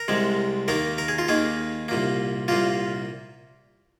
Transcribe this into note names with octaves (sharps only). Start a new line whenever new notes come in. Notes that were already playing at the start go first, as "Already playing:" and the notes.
Already playing: A#4
C2 C3 G#3
D#2 D#3 A#3 A#4
A#4
G#4
F4
D#2 D#3 A#3 G#4
C2 A#2 A#3
C2 A#2 A#3 F4